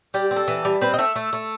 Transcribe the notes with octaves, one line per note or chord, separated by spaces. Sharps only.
G3 G4
C4
A4
E3
G3
C4 B4
D#5
A3 E5
A3
A3